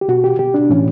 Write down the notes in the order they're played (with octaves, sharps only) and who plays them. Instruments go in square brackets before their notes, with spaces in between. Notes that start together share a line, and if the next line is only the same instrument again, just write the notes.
[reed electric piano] G4
B2 F#4
G4
B2 G4
D4
A2 E3 C#4